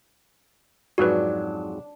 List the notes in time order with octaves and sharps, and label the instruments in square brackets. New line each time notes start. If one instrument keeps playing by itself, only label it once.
[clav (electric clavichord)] F2 G#2 F#3 [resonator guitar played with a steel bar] D4 [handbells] F#4 B4